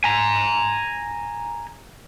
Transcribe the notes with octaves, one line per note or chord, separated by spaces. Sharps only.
G#5 A#5